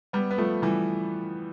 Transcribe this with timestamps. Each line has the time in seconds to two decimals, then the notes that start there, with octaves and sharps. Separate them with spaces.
0.13 G3 B3
0.30 B3
0.38 F3 A3
0.62 E3 G3